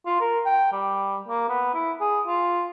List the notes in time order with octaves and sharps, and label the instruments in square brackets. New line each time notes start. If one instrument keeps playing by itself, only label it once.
[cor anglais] F4
A#4
G5
G3
A#3
B3
E4
G#4
F4